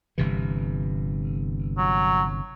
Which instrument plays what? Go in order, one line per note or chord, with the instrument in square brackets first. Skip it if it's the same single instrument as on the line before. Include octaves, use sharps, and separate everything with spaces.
[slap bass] G1 C3 E3
[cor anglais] F#3